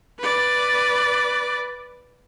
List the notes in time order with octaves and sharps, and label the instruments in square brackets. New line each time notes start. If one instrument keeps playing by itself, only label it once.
[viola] B4 D5